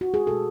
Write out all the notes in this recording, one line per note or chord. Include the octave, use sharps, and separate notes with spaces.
F#4
G#4
B2 G#3 A4